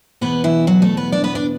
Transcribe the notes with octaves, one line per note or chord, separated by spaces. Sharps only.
E2 B2 B3 B4
E3 E4
F#3 F#4
A3 A4
B3 B4
D4 D5
B3 B4
D4 D5